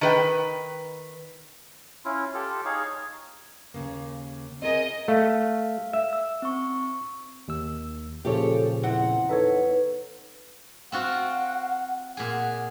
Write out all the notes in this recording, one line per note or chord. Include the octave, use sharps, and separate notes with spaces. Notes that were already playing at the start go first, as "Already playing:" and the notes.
D#3 B4 G5
C#4 E4 F4
F4 G4 A4
D#4 G#4 C#5 F5
D#2 C#3 A#3
C4 G#4 A#4 D#5
A3 F5
E5
E6
C4 C#6
D#2 E6
A#2 C#3 F3 G4 A4 C#5
E2 C4 F#5
D#4 A4 B4 C#5
C4 F4 F#4 F#5
A#2 G#4 F#5